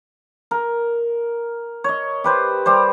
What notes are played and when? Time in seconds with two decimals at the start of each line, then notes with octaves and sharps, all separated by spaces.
0.51 A#4
1.84 C#5 D#5
2.24 G4 B4 C5
2.66 G3 G4 C5